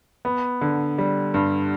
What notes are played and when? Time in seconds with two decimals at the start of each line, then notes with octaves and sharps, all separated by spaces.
0.25 B3
0.61 D3
0.98 G3
1.34 G2